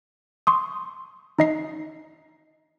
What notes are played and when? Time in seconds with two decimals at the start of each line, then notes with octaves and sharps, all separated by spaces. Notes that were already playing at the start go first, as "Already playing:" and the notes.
0.47 C6 C#6 D#6
1.39 D#4 D#5 C7